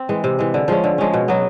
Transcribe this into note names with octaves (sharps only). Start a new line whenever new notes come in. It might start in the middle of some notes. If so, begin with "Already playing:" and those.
Already playing: C4
E3 G#3
C3
E3 G#3
D3
F3 G#3 C#4
D3
F3 G#3 C#4
B2
F#3 B3